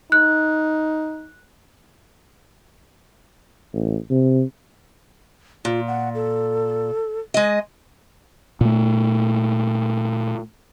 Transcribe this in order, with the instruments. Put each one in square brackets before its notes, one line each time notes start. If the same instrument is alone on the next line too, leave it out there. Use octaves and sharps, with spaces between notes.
[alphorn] D#4 [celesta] F#6
[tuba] A1
C3
[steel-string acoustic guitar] A#2 [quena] F4
[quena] F#5
A4
[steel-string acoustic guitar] G#3 D#5
[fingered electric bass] A#2 A3